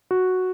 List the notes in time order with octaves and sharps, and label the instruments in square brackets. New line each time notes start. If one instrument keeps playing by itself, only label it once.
[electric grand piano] F#4